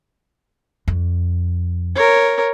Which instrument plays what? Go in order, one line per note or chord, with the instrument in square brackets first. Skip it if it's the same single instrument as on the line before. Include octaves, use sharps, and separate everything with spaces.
[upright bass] F2
[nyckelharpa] A#4 C#5